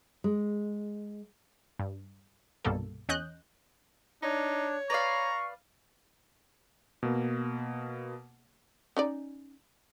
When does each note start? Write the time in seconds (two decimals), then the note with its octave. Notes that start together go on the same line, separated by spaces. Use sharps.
0.24 G#3
1.79 G2
2.65 C2 G2 B2 A#3 A4
3.09 E2 C#4 D#5 F#6 G6
4.23 D4 D#4 C#5
4.90 B4 D5 F5 A#5 C#6
7.03 B2 A#3
8.97 C#4 D#4 D5